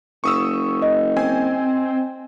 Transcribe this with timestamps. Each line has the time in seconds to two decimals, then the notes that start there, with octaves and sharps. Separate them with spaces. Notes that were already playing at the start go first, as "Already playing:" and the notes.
0.24 F#1 C#6 D#6 E6
0.82 D#5
1.17 C4 G#5